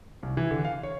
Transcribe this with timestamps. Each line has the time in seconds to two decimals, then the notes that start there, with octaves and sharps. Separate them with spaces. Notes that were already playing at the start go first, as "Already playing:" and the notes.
0.23 C2
0.37 E3
0.51 D3
0.65 F5
0.83 C#5